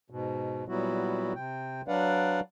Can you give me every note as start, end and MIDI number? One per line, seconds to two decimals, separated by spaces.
0.10 0.64 44
0.10 0.64 47
0.69 1.33 46
0.69 1.33 54
0.69 1.33 55
0.69 1.33 59
0.69 1.33 64
0.69 1.33 66
1.35 1.81 48
1.35 1.81 79
1.88 2.40 54
1.88 2.40 62
1.88 2.40 71
1.88 2.40 74
1.88 2.40 77
1.88 2.40 78